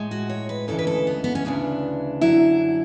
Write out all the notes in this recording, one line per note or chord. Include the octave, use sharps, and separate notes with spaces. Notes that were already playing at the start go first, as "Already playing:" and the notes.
Already playing: A2 G#3
F#4
C#5
B4
D2 C#3 E3 G#3 A4
B4
A4
B3
B3
C#4
D2 C#3 E3 D4
F#2 D3 F#3 E4